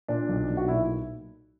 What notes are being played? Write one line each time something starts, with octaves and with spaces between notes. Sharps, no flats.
A#2 D4
B1
B1
F#4
A#2 E4